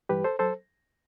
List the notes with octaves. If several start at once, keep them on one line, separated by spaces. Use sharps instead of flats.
G2 E3 G3 G4 B4
A4 C5
F#3 A4 C5